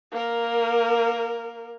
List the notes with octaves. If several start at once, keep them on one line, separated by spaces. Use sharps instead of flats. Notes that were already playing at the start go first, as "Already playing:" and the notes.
A#3 A#4